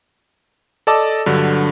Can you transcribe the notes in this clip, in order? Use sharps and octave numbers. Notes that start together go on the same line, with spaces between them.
A4 D5 D#5 A5 D6 E6
G2 D3 F#3